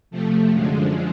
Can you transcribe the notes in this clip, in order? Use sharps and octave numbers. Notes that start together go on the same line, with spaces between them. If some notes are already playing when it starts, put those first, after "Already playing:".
C3 F3 A3
F#2 D3 F3 G#3